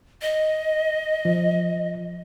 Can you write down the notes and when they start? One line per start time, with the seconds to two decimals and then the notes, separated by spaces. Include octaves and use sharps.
0.22 D#5
1.25 F3